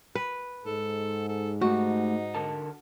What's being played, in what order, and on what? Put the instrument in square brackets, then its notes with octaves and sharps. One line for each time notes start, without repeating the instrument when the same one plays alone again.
[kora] B4
[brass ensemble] G#2 [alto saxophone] A4
[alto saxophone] A4
[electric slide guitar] A3 G4 [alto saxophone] D#4 [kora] F#4
[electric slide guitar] D3 A#4 A5